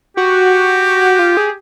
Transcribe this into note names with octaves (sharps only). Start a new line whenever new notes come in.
F#4 G4
F4
G#4